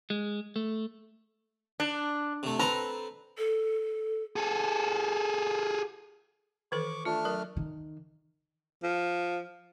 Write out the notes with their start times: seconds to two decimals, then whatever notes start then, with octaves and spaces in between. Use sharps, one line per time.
0.10 G#3
0.56 A3
1.80 D4
2.43 C3 A3
2.59 C4 A4 B4 A#5
3.38 A4
4.36 G#4 A4
6.72 D#3 E3 A4 C#6 D6
7.05 A3 D4 F4 F6
7.25 F#3 A#4
7.57 D#3
8.83 F3